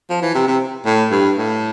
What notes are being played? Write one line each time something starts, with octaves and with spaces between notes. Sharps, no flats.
F3
E3
C3
C3
A2
G2
A2